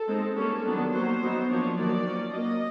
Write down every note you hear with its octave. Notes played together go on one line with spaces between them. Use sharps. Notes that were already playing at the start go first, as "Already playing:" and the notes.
Already playing: A4
G#3 C4 D#4
G3 A#3 C#4 A4
D#3 F#3 B3 D4
F#3 A#3 C#4 C5
F#3 B3 D#4
F3 A#3 D4 C#5
D#3 F#3 A#3 D#4 D5
F3 A#3 C#4
F#3 A#3 C#4 D#5